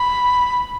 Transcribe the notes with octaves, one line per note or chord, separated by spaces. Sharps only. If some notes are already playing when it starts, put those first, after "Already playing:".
Already playing: B5